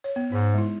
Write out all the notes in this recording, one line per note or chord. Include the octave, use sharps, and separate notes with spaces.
C#5
B3
G#2 D#4 G#4
G#3 E4